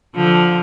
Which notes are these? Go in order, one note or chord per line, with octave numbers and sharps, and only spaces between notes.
D3 F3